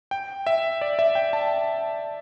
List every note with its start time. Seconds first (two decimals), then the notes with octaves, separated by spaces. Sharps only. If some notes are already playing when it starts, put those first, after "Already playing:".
0.11 G5
0.47 E5
0.81 D5
0.99 E5
1.15 G5
1.33 A5